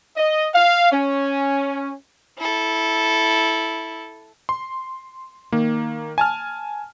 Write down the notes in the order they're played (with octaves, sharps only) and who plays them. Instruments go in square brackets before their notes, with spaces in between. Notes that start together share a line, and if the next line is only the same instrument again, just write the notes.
[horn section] D#5
F5
C#4
[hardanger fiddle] E4 A4
[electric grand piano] C6
D#3 A#3
G#5 A5 F6